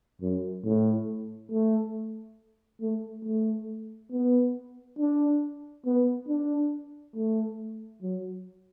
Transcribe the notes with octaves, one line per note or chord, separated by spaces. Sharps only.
F#2
A2
A3
A3
A3
B3
D4
B3
D4
A3
F#3